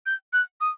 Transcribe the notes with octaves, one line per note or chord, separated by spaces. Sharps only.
G6
F#6
D#6